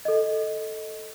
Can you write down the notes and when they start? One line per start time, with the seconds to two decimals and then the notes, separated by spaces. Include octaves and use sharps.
0.05 A4 D#5